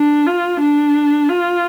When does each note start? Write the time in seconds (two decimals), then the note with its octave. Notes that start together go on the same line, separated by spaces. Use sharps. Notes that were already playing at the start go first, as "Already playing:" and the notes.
Already playing: D4
0.27 F4
0.61 D4
1.29 F4